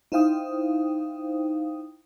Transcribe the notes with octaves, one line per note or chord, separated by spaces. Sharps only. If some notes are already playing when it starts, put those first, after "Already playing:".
D#4 E4 C5 F5 G5 D#6